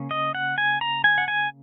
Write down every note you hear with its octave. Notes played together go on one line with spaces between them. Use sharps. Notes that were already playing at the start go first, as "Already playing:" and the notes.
Already playing: C#3 A#3 C#4
D#5
F#5
G#5
A#5
G#5
F#5
G#5